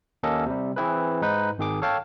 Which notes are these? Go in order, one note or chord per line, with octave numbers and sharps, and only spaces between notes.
D#2 A#3 C#4 A4 D#5
C3 G3
E3 C4 E4 G#4 B4
G#2 D#4 B4
G#1 D#3 G#4 D6
A4 C#5 F5 G5 A5